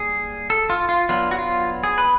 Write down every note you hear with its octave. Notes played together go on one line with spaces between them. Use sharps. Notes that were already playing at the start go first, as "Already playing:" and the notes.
Already playing: G3 A#3 G#4
A4
F4
F4
F#3 B3 D4 F4
F#4
F4
G#4
B4